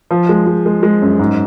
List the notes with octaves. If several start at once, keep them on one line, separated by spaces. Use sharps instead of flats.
F3
G#3
G#3
G#3
G#3
F#2
G#2